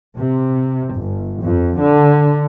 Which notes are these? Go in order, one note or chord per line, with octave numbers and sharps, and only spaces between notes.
C3
G1
F2
D3